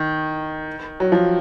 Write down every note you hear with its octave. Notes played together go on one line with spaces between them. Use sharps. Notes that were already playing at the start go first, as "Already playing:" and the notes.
Already playing: D#3
F#3
F3